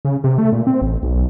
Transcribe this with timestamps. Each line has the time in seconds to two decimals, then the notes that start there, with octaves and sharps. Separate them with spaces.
0.05 C#3
0.24 C3
0.38 A3
0.53 A#2
0.67 C4
0.82 A1
1.03 B1